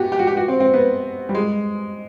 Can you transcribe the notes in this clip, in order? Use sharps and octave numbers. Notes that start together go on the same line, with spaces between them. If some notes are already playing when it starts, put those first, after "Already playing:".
Already playing: B3 F#4 G4
G4
F#4
G4
F#4
C4
C4
B3
G3
G#3